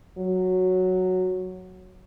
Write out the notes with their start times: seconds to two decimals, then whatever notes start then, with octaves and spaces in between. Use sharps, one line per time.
0.18 F#3